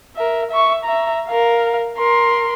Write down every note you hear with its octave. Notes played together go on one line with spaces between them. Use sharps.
A#4 E5
E5 C#6
E5 A#5
A#4 F5
A#4 C6